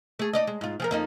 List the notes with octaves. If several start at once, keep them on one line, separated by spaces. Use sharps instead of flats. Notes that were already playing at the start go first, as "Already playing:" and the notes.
A3 G#4
D#4 D5 D#5
G#3
G#2 F4
F3 G#4 A#4
F2 A#3 D#4